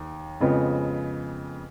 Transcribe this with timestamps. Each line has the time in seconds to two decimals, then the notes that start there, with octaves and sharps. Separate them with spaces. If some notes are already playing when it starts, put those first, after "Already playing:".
Already playing: D#2
0.40 F2 C#3 F3 G#3 B3